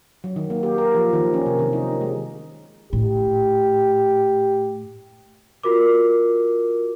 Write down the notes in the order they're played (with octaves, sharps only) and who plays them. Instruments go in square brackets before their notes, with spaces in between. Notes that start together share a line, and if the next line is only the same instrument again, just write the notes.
[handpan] F#3
D#3
A#3
G4
A#4
F3
D#3
C#4
C3
D#3
D#4
G#3
[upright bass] A2 [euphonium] G4
[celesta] F4 F#4 A#4 D6